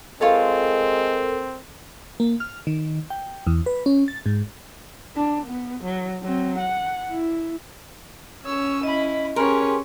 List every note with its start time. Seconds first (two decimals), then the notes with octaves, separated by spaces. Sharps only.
0.21 G#3 C4 F4 A4 A#4 C#5 A5
2.20 A#3
2.40 F6
2.67 D#3
3.10 G5
3.47 E2
3.66 B4
3.86 C#4
4.08 A6
4.26 G#2
5.16 D4
5.46 B3
5.84 F#3
6.23 F#3 C4
6.59 F#5
7.12 E4
8.45 C#4 C#5 E6
8.83 E4 D#5 B5
9.36 C#4 G4 G#4 A#4 B4 C#5 G#5 C6